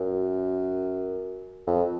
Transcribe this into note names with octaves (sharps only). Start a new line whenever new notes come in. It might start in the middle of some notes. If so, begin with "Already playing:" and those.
Already playing: F#2
F2